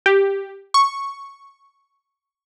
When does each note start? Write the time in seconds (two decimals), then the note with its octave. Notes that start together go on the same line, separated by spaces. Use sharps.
0.06 G4
0.74 C#6